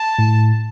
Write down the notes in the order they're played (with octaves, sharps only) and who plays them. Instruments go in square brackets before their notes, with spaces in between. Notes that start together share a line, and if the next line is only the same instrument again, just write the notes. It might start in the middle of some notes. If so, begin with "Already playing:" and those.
Already playing: [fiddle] A5
[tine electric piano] A2